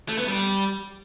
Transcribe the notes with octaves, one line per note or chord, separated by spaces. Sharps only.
A3
B3
G3